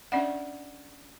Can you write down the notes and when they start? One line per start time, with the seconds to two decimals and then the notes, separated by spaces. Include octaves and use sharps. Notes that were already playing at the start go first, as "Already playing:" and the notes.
0.12 C#4 D4 D5 E5 F#5